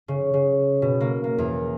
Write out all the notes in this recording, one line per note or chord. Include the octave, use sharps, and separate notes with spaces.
C#3
C#3
B2
A#3
A#3
E2